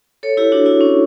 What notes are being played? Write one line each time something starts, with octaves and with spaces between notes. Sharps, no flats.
A4 C#5
E4 G4
D4 F#4
E4
C#4